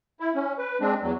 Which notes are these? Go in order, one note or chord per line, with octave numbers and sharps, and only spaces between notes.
E4
C#4
B4
G#3 C4 D4
E2 F#3